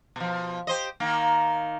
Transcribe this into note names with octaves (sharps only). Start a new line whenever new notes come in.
B2 F3
G4 C5 D#5
D#3 A#3